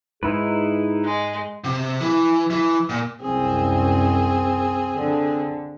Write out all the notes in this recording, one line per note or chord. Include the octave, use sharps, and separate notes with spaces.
G#2 D#4 E4 G#4 B4
G#3
C3
E3
E3
A#2
C2 F#2 C4 G#4
D3